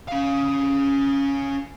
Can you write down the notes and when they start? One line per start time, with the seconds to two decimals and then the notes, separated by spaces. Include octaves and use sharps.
0.08 C#4 F5